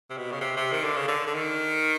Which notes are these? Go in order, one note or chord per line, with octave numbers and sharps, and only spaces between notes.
C3
B2
C#3
C3
C3
D#3
D3
C#3
D3
D3
D#3